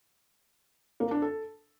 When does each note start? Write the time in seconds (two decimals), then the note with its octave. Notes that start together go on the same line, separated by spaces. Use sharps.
1.00 A#3
1.11 D4
1.22 A4